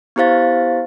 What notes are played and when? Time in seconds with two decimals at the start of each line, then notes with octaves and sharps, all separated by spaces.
0.16 B3 E4 G4 C5 F5 A6